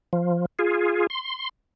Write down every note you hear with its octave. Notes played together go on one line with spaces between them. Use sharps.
F3
F4 G#4
C6